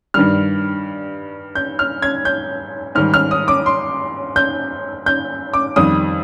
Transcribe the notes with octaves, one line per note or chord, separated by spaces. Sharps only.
G2 D#3 G3 F6
G6
F6
G#6
G6
G#2 D#3 G3 F6
F6
D#6
D6
C6
G6
G6
D6
F2 D#3 G3 D#6